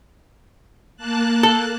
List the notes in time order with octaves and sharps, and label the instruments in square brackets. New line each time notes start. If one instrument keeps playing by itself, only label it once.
[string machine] A#3 A5 F#6
[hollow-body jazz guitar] A4